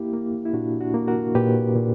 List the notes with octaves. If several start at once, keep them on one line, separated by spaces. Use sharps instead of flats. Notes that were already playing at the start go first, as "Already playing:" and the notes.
Already playing: A#3 E4 G4
A#3
E4
A#2 D4 F#4
D4 F#4
A#3
F#4 A#4
A#2 G4 B4
A#2